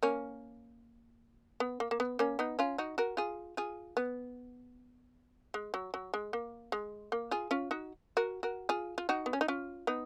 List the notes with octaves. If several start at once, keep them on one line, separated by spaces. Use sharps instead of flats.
A#3 C#4
B3
A#3
A#3
B3
A#3 C#4
B3 D#4
C#4 F4
D#4 F#4
F#4 A#4
F4 G#4
F4 G#4
B3
G#3
F#3
F#3
G#3
A#3
G#3
A#3
F4 G#4
C#4 F4
D#4 F#4
F#4 A#4
F#4 A#4
F4 G#4
F4
D#4 F#4
B3
C#4
D#4
C#4 F4
B3 D#4